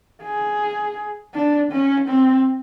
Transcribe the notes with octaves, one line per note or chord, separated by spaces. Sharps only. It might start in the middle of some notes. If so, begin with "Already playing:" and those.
G#4
D4
C#4
C4